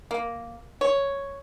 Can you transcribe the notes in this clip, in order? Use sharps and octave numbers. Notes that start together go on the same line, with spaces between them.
A#3
C#5